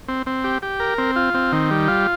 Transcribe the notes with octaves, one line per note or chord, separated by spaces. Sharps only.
C4
C4
G4
G4
A#4
C4
F4
C4
D#3
G3
F4